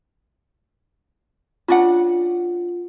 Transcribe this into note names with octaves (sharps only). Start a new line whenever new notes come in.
C#4 D4 F4 F#5